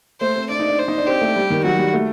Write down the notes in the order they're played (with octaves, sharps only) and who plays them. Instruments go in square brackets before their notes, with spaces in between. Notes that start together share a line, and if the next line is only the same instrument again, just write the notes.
[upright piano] A3 [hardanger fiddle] C5
[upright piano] C4
[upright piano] D4 [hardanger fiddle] D5
[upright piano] D#4
D4
[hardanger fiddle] C5
[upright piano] D#4
D4
[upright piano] C4 [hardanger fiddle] G4
[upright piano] A3
G3
D#3
[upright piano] F#3 [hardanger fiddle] F#4
[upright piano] G3
A3